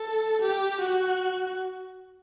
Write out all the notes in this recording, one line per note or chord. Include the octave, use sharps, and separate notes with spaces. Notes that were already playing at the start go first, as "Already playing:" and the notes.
Already playing: A4
G4
F#4